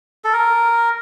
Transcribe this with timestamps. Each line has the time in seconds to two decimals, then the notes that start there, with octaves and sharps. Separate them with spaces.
0.24 A4
0.33 A#4